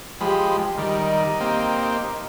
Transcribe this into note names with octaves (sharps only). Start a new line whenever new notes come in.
F3 G#3 G4 B5
D#3 G3 D#4
A#3 C4 G4